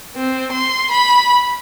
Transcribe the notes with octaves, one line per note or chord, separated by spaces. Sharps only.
C4
C6
B5